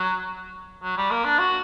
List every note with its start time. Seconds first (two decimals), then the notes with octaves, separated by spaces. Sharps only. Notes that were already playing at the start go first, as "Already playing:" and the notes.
Already playing: F#3
0.83 F#3
0.97 G3
1.11 A#3
1.25 D4
1.39 F#4